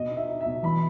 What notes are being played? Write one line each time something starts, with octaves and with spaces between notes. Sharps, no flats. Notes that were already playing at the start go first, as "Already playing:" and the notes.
Already playing: B2 D#5
D#4
E5
D#4
E5
B2
E3 B5